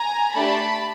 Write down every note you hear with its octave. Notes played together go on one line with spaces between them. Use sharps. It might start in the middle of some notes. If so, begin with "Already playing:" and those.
Already playing: G#5 A#5
A3 D4 G4 A5 B5